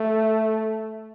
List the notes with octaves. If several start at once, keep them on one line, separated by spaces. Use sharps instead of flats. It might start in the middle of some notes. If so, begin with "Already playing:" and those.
Already playing: A3